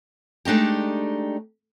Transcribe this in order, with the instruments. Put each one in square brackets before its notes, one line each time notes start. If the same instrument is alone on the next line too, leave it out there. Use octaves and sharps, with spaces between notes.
[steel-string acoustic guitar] G#3 A3 D4 D#4 G4